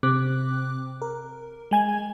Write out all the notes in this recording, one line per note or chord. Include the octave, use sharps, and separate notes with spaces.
C3 C4 D6 F#6
A#4
G#3 G#5 G#6